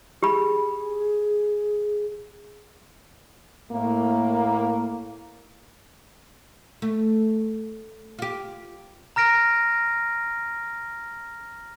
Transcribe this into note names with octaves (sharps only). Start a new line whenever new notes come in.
G4 G#4 B5
A2 A#3
A3
F4 G4
A#5 F6 A#6 D7